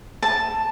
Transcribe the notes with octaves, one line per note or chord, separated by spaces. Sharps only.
A5